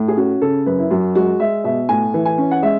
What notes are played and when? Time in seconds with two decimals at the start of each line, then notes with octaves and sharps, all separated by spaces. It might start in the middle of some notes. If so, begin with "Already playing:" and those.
Already playing: A2
0.08 G#4
0.17 C#4 F#4
0.42 C#3 A4
0.66 F#2 B4
0.79 E4
0.91 F#2 F#4
1.15 G#3 F#4
1.40 G#3 E5
1.64 B2 E5
1.89 A2 G#5
2.14 E3
2.25 G#5
2.38 C#4
2.51 F#5
2.62 G#3 E5